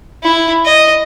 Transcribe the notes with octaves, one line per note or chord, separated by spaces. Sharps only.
E4
D#5